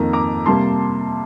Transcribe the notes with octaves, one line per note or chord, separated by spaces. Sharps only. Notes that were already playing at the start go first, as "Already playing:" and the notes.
Already playing: F2 D#3 A#3 A#5
A#5 D6
C3 G3 A#3 A5 C6